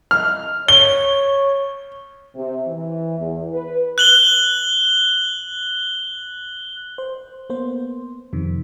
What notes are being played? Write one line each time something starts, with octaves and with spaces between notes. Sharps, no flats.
F6
C#5 G7
C3
E3
E2
B4
F#6 F#7 G7
C5
A#3 B3 C5
F2 C3 D#3